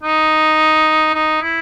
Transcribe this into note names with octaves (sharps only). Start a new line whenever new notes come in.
D#4
D#4
E4